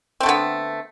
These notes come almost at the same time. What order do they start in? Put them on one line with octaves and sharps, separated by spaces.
C4 A3 D3 B3